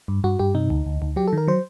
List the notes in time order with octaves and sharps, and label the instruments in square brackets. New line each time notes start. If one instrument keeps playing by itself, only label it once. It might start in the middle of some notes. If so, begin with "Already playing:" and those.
[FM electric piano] G2
G2 F#4
G2 G4
C3 D#4
D2
D2
D2
F#3 G4
A4
D#3 A#4
F#3 C5